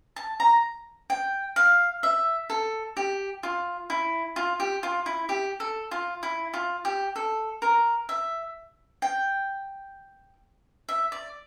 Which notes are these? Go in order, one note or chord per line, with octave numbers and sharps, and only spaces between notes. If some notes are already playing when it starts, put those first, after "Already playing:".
A5
A#5
G5
F5
E5
A4
G4
F4
E4
F4
G4
F4
E4
G4
A4
F4
E4
F4
G4
A4
A#4
E5
G5
E5
D5